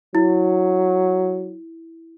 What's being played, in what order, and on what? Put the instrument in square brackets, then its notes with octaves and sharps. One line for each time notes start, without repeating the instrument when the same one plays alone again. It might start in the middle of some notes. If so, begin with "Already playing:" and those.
[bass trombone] F#3 [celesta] E4